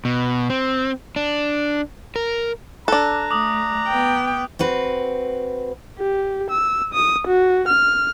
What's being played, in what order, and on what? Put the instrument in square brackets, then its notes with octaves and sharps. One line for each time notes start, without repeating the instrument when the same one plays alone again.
[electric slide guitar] B2
C4
D4
A#4
[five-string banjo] D4 A4 [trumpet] A#5 [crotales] F#6
[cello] A3 [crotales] D6 D#6
[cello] B3 G5
[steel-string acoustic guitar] C4 F#4 B4
[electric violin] G4
E6
D#6
F#4
F6